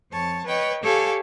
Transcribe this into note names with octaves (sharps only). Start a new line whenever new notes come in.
F2 C#5 A5
B4 C#5 D#5 G5
G4 A4 C#5 F5 G#5